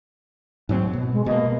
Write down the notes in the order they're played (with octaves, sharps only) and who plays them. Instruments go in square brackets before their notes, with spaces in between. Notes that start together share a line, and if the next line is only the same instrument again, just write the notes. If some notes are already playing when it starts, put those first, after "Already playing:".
[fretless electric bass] G#2 F#3 C4
B2
[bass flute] G#3
[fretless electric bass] B2 A#3 [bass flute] D#5